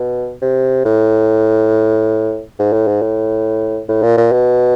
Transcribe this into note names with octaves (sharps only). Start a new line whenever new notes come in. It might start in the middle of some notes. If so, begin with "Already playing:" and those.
Already playing: B2
C3
A2
G#2
A2
G#2
A2
A2
A#2
A#2
B2